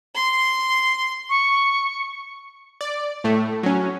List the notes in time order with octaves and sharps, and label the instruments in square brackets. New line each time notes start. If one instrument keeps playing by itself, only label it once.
[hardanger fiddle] C6
[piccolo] C#6
[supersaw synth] D5
A2 A3
F#3 C#4